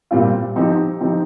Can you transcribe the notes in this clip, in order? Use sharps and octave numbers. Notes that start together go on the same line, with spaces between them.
A#2 G3 C4 F4
F3 C4 D#4 G4
F3 C4 D#4 G4